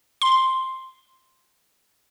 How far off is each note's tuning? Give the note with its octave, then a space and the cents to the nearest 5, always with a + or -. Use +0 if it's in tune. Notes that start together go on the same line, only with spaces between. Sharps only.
C6 +0